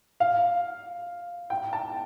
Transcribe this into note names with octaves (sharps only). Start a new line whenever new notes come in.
F5
G5
A5